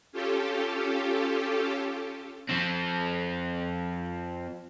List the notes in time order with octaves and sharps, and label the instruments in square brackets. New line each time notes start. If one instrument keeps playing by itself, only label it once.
[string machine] C#4 F4 G4 A4
[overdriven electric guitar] F3 C4